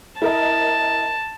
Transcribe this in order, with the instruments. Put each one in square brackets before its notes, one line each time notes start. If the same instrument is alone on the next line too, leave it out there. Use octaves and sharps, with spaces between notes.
[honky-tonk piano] E4 A#4 D#5 [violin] A5